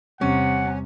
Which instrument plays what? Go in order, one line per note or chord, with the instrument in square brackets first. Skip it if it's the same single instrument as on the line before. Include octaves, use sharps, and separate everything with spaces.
[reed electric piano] E2 G3 [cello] C3 [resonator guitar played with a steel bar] C#4 [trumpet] F#5